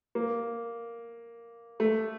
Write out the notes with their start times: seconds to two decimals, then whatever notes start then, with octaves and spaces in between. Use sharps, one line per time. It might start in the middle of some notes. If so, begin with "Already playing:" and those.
0.15 A#3
1.80 A3